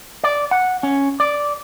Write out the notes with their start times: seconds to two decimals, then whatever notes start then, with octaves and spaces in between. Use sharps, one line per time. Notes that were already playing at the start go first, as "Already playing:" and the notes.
0.24 D5
0.51 F#5
0.83 C#4
1.20 D5